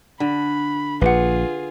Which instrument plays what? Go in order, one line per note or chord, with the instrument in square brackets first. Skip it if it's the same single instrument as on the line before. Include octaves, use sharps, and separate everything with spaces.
[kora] D3 [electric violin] B5
[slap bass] A#1 [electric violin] F4 G#4 [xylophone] B4 F#5